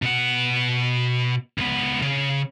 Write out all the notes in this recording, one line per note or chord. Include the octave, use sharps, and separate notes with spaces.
B2 F#5
C#2 B3
C#3